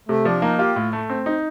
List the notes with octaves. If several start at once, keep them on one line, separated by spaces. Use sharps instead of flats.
C3 A3
F3 D4
A#3 D#4
F4 G4
A2
A3
C4
D#4